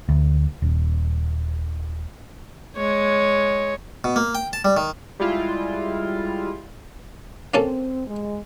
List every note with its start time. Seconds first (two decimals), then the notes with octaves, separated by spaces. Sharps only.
0.09 D2
0.62 D#1
2.76 G#3 C#5
4.04 B2
4.16 A#3
4.35 G5
4.53 A5
4.65 G3
4.77 D#3
5.19 G3 G#3 E4 F4
7.54 A#3 C4 C#4 A4
8.07 G#3